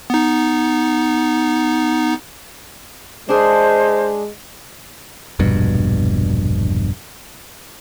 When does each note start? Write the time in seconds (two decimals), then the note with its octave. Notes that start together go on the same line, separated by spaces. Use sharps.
0.10 B3 D#4
3.29 G#3 D4 G#4 C5
5.39 E1 A#1 G2 B2